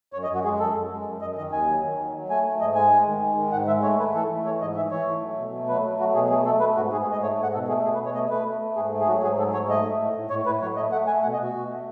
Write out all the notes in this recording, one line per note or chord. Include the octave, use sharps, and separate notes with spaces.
F#2 C#5
D#5
F#2
F#4
G#3 G#4
F#2 A4
F#2
G#3
F#2
F#2 D#5
D#3 D#5
D#2 G#5
F#3
D#3
F#3
F#3
A3 G#5
A3
G#2 D#5
G#3 G#5
G#3
D#3
G#3
D#3
G#2 F#5
G#3 E5
A3 C#5
A3 B4
E3 A4
A3
E3 C#5
G#2 D#5
E3 E5
E3 C#5
A3
F#3
B2
A3
F#3 B4
A3
F#3 F#4
B2 G#4
A3 G#4
A3 A4
A3 B4
G#2 F#4
G#2 G#4
G#4
G#2 D#5
A3 C#5
G#2
F#5
B2 A4
A3 G#4
B2 G#4
B4
B2
C#5
A3 D#5
A3 B4
A3
A3
G#2 G#4
A3
G#4
F#3 F#4
G#2 G#4
F#3 A4
G#2 C#5
A3 D#5
A3
A2
A2
A2 C#5
A2 B4
F#3 C#5
A3 D#5
A3 F#5
A3 G#5
B2 F#5
D#5
B2 F#4
B2
A3